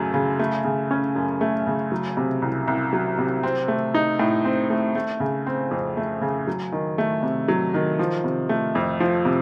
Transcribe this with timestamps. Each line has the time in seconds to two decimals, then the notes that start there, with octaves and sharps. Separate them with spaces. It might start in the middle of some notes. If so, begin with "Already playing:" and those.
Already playing: F#2 C#3 F#3 A3
0.14 C#3
0.39 A3
0.64 C#3
0.91 C#4
1.16 F#2
1.41 A3
1.67 C#3
1.92 F#3
2.17 C3
2.42 C2
2.68 C2
2.93 F#3
3.18 C3
3.43 C4
3.68 A3
3.94 D#4
4.19 A2
4.45 C4
4.70 A3
4.95 A3
5.20 C#3
5.47 C4
5.71 F2
5.97 A3
6.21 C#3
6.47 F#3
6.72 D#3
6.98 A3
7.23 C3
7.48 F#3
7.74 D#3
7.99 F3
8.24 C3
8.49 A3
8.75 F2
9.00 F3
9.25 C3